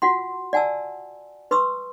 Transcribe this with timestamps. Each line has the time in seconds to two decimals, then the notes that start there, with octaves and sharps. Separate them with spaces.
0.02 F4 F#4 F#5 C6
0.53 D5 F#5 G#5 A5 E6
1.51 B4 C6 C#6 D#6 E6